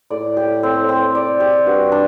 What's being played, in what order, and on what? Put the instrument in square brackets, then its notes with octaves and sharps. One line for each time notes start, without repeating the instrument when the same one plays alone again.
[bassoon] A2 [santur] D5
[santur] G4
C4
C4
D5
G4
[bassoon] G2 [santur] F#4
[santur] D4